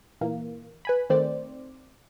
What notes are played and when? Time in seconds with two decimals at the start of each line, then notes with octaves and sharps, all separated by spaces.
0.21 A#2 E3 A#3
0.85 B4 G#5 B5
1.10 D#3 A3 C4 C5 D5